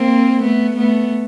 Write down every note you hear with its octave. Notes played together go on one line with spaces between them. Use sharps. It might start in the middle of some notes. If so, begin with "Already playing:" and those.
Already playing: A#3 C4
A3 B3
A3 B3